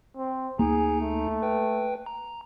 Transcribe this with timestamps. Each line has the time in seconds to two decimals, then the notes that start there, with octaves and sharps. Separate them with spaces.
0.17 C4
0.59 D2 A#3 D#4 G#4 A#5
1.01 A3
1.42 B4 G5
2.06 A#5